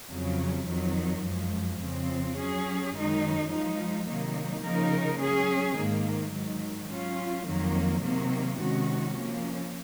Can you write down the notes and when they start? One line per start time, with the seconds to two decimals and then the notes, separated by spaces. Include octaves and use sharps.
0.10 F2 C#3 F#3
0.67 F2 D#3 F#3
1.24 F#2 F3 G#3
1.81 F2 C#3 F3 C4
2.36 F#3 C#4 G#4
2.94 F#2 D#3 G#3 D#4
3.50 F3 G#3 D#4
4.06 C3 D#3 F#3 A#3 D#4
4.63 C#3 F3 A#3 D#4 A#4
5.19 F#3 C#4 G#4
5.76 G#2 D#3 A#3
6.32 G#2 D#3 F#3
6.89 F#3 C#4 F4
7.45 F2 D#3 F#3 A#3
8.02 C3 D#3 F#3 A#3
8.58 C3 D#3 G#3 C#4 F#4
9.14 F3 A#3 C#4